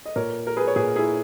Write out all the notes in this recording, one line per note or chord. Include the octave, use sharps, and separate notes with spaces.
D#5
A#2 A#4 C#5
A#4
G#4 B4
C#5
A#2 G#4 B4
E4 G#4